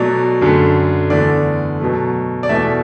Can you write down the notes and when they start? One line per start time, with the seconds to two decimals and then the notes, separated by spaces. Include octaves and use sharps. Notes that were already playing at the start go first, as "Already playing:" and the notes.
Already playing: B2 F#3 A3 D5
0.41 F#2 D3 A3
1.10 E2 D3 A3 D5
1.80 B2 F#3 A3
2.43 D5
2.49 E2 B2 A3 E5